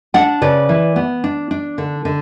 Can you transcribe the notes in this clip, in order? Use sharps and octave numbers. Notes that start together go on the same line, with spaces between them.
D4 D5 F#5
C#3 B4 D5
E3
B3
D4
D4
D3
D3